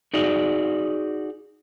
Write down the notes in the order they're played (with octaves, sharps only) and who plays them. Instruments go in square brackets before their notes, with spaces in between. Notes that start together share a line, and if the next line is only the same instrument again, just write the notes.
[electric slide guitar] D#4 F#4 G#4 D5